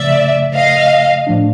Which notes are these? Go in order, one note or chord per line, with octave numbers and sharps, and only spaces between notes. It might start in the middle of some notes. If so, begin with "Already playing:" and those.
Already playing: C#3 F3 A3 D5 E5
D#5 F5
A2 F3 A3 D4